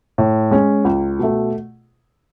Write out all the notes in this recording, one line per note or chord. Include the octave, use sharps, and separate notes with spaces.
A2
G#3 C#4
C#2
B2 A3